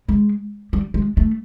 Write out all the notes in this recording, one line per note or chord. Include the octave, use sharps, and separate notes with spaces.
G#3
G3
G#3
A3